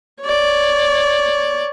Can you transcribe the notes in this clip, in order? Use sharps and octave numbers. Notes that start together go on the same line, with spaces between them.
C#5 D5